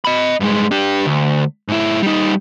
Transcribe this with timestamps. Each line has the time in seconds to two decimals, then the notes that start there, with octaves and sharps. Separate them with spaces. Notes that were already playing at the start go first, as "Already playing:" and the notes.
0.05 D#5 B5
0.40 G2 G#3
0.71 D4 G4
1.06 D2
1.68 G#2 E4
2.02 G3 D#4